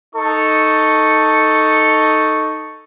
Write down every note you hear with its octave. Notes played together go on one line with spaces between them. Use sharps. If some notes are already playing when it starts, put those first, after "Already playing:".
D#4 A4 C#6